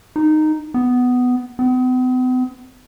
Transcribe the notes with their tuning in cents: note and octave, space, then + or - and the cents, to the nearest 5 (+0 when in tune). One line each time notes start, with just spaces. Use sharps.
D#4 -10
B3 +10
B3 +45